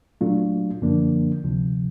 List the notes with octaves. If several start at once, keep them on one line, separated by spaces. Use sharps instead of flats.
A#2 F#3 A3 D4 F4
F#2 D3 F3 A#3 D4
D2 C3 F3